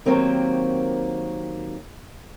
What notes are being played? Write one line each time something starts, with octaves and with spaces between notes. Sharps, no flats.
D#3 F#3 A#3 C4 G4